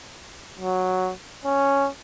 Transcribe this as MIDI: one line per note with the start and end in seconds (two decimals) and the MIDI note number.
0.59 1.12 54
1.45 1.89 61